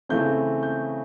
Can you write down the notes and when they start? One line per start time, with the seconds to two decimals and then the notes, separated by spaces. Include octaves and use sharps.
0.09 C#3 E3 A3 C4 G6
0.63 G6